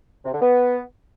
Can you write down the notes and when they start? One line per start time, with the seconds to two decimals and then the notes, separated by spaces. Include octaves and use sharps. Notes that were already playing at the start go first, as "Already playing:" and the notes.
0.25 C3
0.33 D3
0.42 B3